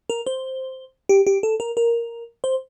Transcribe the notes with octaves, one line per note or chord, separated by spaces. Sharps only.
A#4
C5
G4
G4
A4
A#4
A#4
C5